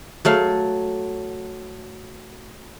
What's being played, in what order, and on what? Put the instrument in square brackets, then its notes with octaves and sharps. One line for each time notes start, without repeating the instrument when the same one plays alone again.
[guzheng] F#3 A3 F5